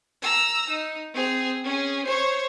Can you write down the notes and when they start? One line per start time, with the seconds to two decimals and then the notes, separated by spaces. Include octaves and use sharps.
0.22 A#5 E6
0.69 D#4
1.14 C4 G#4
1.64 C#4 G#4
2.05 C5 C#5